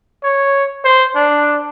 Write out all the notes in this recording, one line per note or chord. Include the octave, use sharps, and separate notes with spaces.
C#5
C5
D4